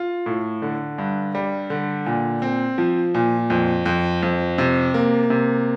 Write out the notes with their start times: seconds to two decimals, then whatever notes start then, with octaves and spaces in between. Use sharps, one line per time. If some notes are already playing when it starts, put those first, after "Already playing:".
Already playing: F4
0.26 A2
0.62 D3
0.98 G2
1.35 G3
1.70 D3
2.06 A#2
2.42 C4
2.78 F3
3.14 A#2
3.50 F2
3.86 F2
4.23 F2
4.58 C3
4.94 A#3
5.30 C3